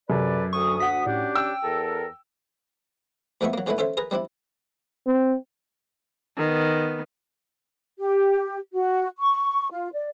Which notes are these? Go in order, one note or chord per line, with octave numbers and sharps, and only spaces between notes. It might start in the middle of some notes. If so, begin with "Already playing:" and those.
F#2 C3 A4 B4 D5
D2 C#6 D#6
F#4 F#5 B6
A2 C#4 D4 G4
G5 E6
E2 A4 A#4
D2 F3 G#3 B3 E5 C#6
F#3 A#3
B1 F#3 G#3 A3 E4 B4
C#4 A4 C5 E5 C6
G#4 A#4 B4 A#5
G3 C4 D4 E4
C4
D#3 B3
G4
F#4
C#6
F4
D5